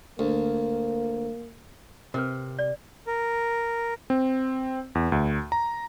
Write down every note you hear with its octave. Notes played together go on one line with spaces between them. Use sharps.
D2 A#3
C3 A#4 B4
D5
A#4
C4
E2
D2
A#5